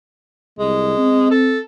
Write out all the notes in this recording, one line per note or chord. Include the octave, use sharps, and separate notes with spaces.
C2 G#3
C4
A4